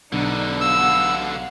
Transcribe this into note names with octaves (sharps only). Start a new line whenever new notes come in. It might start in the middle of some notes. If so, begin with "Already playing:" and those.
B1 B2 D3 D4 D#4
F5 F#5 E6